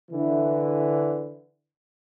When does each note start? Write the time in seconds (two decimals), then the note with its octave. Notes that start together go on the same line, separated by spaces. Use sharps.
0.11 D3 E3